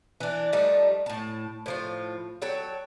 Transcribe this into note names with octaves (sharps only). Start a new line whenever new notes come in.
E3 D4
F3 G3 A3 D#4
A2 A5
A2 F3 F4
F#3 A4 C#5 G5